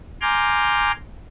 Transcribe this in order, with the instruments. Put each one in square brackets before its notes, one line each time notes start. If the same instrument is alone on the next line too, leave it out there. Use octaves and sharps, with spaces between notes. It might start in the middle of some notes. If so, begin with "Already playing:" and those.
[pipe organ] G#5 A#5 C6 D6 F6 G6